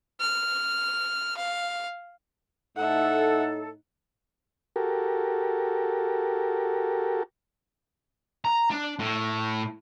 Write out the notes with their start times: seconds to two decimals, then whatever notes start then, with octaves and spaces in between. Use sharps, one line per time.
0.20 F6
1.37 F5
2.77 A2 A3 D#4 A4 E5 F#5
4.76 F#4 G4 A4 A#4
8.45 A#5
8.71 D4
8.99 A2